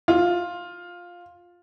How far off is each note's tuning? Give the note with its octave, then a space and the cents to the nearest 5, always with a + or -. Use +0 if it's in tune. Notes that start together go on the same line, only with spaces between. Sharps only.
F4 +10